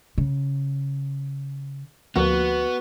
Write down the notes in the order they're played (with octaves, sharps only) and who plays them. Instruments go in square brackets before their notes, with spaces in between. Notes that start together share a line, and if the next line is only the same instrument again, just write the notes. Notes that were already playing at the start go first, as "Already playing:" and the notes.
[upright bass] C#3
[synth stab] D2 F3 A#3 [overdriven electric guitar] B3 [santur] F#4